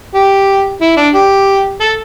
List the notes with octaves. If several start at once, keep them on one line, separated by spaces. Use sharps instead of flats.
G4
E4
D4
G4
A4